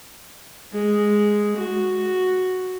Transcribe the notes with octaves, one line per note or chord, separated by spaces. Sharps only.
G#3
F#4